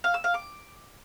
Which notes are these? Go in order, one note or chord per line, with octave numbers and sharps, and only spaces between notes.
F5
E6
F5
D6